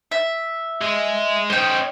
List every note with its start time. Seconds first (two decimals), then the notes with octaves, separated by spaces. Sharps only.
0.11 E5
0.81 G#3
1.50 C#4 C5 D#5 G5